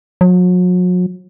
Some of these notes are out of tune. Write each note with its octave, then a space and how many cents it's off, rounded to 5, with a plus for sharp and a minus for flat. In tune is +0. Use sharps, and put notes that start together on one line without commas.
F#3 -40